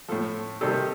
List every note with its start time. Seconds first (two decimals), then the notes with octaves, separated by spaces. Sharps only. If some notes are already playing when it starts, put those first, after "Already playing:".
0.08 A2 F3 A4
0.61 C3 D#3 G3 A4